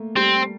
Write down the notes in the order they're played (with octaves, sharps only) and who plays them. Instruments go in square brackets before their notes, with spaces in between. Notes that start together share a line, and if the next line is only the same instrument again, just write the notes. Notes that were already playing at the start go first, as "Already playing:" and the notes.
Already playing: [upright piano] A3 A#3
[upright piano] G3 [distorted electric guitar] C4